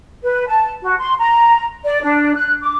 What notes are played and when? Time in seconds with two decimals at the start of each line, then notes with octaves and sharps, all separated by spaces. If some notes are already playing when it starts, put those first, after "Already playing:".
0.23 B4
0.48 A5
0.82 F#4
0.99 C6
1.19 A#5
1.85 D5
2.03 D4
2.35 F#6
2.62 D6